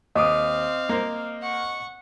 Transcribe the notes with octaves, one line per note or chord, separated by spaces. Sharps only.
D#2 C4 D#5 F5 D6 D#6
A#3 A#4 C5
F#5 C#6